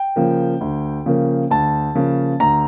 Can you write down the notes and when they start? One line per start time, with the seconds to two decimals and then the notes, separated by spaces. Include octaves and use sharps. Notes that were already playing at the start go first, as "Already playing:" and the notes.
Already playing: G5
0.16 C#3 F3 A#3
0.61 D2
1.06 C#3 F3 A#3
1.51 D2 A5
1.95 C#3 F3 A#3
2.40 D2 A#5